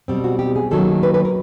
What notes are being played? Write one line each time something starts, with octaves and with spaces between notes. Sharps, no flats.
B2 G3 C4
F#4
G4
G#4
D#3 F#3 A#3 C#4 A4
B4
B4
A#4